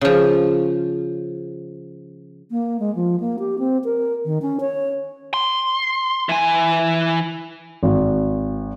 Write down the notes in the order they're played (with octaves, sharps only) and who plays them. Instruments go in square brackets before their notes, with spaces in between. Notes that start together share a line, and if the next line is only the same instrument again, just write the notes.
[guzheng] C#3 F3
[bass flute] A#3
G#3
F3
A#3
G4
C4
A#4
D#3
C#4
C#5
[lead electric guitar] C6
E3 G#5
[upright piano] G#1